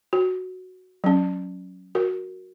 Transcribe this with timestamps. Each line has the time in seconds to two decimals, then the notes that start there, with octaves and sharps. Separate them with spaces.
0.13 F#4
1.04 F#3 C#4
1.95 F#4 A#4